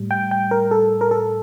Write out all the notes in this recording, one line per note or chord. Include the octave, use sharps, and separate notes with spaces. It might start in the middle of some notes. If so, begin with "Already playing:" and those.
Already playing: A2 G3
G5
G5
A#4
A4
A#4
A4